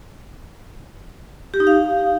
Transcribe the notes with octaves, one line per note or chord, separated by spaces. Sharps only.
G4
D#4
F5